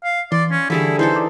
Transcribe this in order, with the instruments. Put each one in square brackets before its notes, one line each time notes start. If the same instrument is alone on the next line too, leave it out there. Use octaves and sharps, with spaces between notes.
[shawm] F5
[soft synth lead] E3 [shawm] D5 [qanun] C6
[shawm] C#4
[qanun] D3 G3 G#4 [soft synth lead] E3 [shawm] E4
[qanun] E3 D#4 A4 [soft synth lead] G#4 [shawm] C5
[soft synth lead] D5